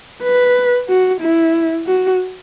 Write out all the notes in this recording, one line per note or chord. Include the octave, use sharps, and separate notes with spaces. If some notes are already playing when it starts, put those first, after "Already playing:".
B4
F#4
E4
F#4